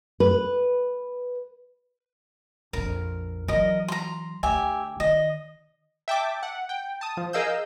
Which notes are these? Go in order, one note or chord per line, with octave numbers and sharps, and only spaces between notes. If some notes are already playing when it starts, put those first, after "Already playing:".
B4
A#1 F2 A#4
E3 F#3 A#4 D#5
A#5 C6
D2 G4 E5 G#5
D#3 D#5
E5 G5 A5 D6
F#5
G5
A5 D#6
F3
G#4 A#4 D#5 F5 E6 G6